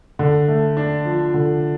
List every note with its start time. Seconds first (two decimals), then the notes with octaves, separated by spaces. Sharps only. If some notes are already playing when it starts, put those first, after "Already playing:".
0.19 D3
0.48 A3
0.77 D4
1.05 F3
1.34 D3